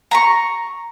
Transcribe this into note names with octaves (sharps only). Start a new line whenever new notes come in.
A#5 B5 C#6